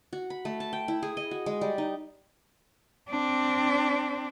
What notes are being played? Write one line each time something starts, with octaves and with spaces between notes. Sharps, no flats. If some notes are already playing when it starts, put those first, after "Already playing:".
F#4
B5
A3
A5
G5
E4
G#4
D#5
F#4
G#3
G3
D#4
C4 D4